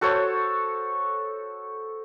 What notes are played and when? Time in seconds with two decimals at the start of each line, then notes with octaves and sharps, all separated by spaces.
0.01 F#4 A4 C5 C#5